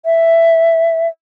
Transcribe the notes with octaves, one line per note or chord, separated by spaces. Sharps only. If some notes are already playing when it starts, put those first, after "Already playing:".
E5